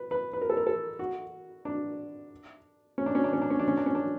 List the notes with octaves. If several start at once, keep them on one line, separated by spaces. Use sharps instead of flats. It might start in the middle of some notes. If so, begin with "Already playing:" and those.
Already playing: B4
B4
B4
A#4
A4
A#4
A4
F#4
D4
C#4
D4
C#4
D4
C#4
D4
C#4
D4
C#4
D4
C#4
D4